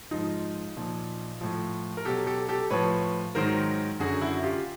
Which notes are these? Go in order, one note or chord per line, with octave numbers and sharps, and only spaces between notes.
G#2 F3 D#4 F4
A#2 F3
A2 F3
A#4
B2 F#3 G4 A4
G4 A4
G4 A4
A2 F3 B4 C#5
G#2 D#3 F#3 A#4 C5
F#2 D3 F#3 F#4 G#4
E4 F#4
F4 G4